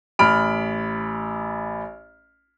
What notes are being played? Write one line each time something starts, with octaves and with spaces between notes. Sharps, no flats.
A1 B5 F6 D7